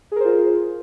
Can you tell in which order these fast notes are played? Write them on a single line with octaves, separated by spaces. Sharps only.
G#4 A#4 C5 F4